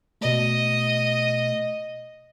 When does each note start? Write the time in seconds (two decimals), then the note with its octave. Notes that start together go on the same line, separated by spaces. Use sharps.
0.21 B2 A3 D#5